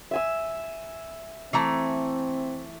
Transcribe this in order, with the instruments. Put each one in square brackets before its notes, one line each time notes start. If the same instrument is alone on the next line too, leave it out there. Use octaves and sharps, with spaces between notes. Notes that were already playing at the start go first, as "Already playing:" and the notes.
[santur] E5 G#5 E6
[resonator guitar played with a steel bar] E3 A3 A#5 [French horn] C4